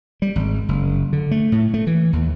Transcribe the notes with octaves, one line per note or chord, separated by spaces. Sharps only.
G3
G#1
F#1
D3
A3
A2
A3
E3
D#2